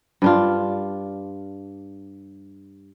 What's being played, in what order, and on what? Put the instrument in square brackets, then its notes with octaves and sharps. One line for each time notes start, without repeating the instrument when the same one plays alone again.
[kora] G2 D4 F4